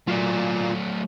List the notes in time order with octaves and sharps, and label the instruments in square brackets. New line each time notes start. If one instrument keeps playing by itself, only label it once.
[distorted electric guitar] F#3 A3 [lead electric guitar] F4 D5